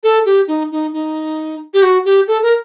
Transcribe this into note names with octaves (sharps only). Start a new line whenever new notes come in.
A4
G4
D#4
D#4
D#4
G4
F#4
G4
A4
A#4